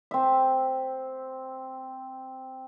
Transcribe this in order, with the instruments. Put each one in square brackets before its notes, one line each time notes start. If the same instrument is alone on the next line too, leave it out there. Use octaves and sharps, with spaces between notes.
[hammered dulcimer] C4 E5